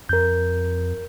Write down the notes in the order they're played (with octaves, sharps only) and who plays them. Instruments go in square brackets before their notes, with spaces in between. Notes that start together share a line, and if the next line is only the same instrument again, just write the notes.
[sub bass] F2 [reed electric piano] A#4 G6